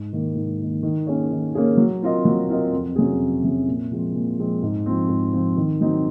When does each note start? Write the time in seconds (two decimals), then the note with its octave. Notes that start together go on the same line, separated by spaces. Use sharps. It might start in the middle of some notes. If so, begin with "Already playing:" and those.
Already playing: G#2
0.13 D#3 A#3
0.36 G#2
0.60 D#3 A#3
0.83 D#3
1.07 A#3 C#4 G#4 C#5
1.31 D#3
1.55 A#3 C#4 G#4 C#5
1.77 F#3
2.02 C4 F4 A#4 D#5
2.25 F#3
2.49 C4 F4 A#4 D#5
2.73 F2
2.96 C3 F#3 C#4 G#4
3.20 F2
3.44 C3 F#3 C#4 G#4
3.67 A#2
3.91 F3 G#3 C4
4.15 A#2
4.38 F3 G#3 C4
4.63 G#2
4.86 F3 C4
5.09 G#2
5.33 F3 C4
5.57 D#3
5.81 F#3 C4 D#4